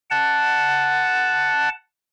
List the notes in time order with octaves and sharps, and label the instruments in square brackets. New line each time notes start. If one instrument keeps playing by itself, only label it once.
[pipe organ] F#5 A5